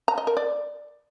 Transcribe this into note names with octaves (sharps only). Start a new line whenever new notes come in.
A#5
D#5
A#4
D5